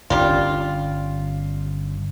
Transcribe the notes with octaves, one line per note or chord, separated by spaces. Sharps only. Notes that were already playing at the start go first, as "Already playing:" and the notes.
G1 G3 C#4 D4 F4